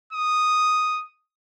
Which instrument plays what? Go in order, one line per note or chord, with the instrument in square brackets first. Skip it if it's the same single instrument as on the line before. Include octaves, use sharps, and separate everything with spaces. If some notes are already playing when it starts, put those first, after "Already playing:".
[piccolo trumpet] D#6